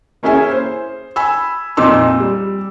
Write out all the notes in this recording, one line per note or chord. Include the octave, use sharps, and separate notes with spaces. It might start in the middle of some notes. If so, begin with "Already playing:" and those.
A#3 C#4 E4 G#4 E5 G#5
C5
G#5 B5 E6
F2 A#2 D#4 C6 D6 E6
G3